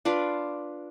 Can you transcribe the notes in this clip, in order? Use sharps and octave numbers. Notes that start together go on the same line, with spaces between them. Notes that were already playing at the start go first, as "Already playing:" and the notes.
D4 F4 B4 D5